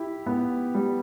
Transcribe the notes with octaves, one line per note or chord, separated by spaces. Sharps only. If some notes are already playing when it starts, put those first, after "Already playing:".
Already playing: E4 G4
B3
G3